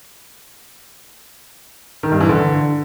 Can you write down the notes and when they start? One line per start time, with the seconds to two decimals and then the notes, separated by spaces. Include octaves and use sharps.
2.03 D#3
2.12 G2
2.20 E3
2.29 D3